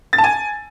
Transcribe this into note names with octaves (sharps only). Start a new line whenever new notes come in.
A6
A5
G#5